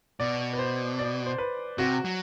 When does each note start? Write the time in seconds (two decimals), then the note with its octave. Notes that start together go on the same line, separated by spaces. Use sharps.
0.20 B2 D5
0.53 B4
0.59 C5
0.99 D5
1.26 C5
1.38 B4
1.78 C3 F#4
2.05 F#3